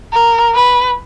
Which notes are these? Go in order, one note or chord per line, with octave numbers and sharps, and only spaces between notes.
A#4
B4